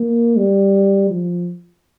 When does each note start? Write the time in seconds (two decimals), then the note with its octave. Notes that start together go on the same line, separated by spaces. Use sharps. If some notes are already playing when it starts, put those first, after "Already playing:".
Already playing: A#3
0.37 G3
1.11 F3